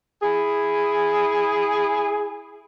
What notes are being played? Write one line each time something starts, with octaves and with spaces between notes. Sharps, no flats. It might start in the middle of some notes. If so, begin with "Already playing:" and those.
E4 G#4